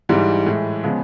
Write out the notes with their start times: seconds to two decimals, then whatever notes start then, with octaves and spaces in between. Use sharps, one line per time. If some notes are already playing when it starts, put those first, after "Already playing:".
0.09 G#2 E3 G3
0.46 A2 E3 G#3
0.83 C#3 F3 G#3 B3